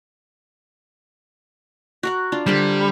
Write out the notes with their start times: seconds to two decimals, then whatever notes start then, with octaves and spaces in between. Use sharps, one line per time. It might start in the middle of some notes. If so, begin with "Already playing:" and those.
2.03 F#4 A#4 F#5
2.32 D4 F4
2.46 D3 G3 A#4 C5